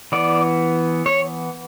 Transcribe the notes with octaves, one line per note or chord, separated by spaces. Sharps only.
E3 B3 D5
C#5